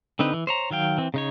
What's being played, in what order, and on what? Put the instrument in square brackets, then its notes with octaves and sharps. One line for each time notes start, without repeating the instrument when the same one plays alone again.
[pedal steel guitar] D3 C4 D#4 B4
E3
C5 C#5 A#5
D#3 F#3 F5 G5
E3 C4
C#3 D#4 C#5